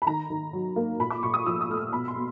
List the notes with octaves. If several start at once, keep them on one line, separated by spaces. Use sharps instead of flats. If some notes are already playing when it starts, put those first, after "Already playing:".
B5
D#3 A#5
D#3
F#3
A#3
A#2 B5
D6
A#2 C#6
D#6
F3 E6
D#6
A3 F6
E6
B2 B5
C6
B2